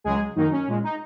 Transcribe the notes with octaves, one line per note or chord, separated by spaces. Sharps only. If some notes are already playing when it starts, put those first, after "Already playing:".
C#2 C#3 F#3 G#3 G#4
F#2 D#3 F#3 A#3 D#4
C#4
A#2 G#3
D#4